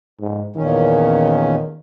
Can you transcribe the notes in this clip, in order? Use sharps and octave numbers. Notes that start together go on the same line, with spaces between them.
G#2
E2 A#2 D#3 C#4